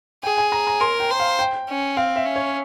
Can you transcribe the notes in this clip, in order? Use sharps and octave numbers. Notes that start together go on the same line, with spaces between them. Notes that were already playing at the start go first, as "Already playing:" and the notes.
G#4 G5
G#5
A#5
A#5
A#4 C6
G5
C5
F5
G5
C#4
C4 F5
E5
C#4
C#5